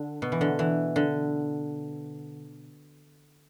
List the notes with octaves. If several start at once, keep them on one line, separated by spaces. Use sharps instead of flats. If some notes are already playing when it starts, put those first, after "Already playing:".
Already playing: D3
B2
E3
D3
E3
D3